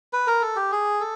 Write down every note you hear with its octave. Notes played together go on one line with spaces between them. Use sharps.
B4
A#4
A4
G4
G#4
A4